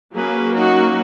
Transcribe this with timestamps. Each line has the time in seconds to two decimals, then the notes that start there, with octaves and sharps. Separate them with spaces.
0.14 F#3 A#3 C#4 G#4 B4
0.53 D#4 F#4